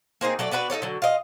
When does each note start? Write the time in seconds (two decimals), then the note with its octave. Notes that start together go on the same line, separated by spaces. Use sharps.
0.21 A#3 C4 D#4 G#4
0.39 F#3 A3 D5
0.51 B3 D4 F#4 B4
0.70 D#4 F4 A4 C#5
0.82 D3 F#3
1.02 F4 D#5